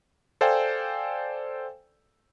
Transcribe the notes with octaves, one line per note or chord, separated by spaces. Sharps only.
A4 C5 D5 F5 G5 G#5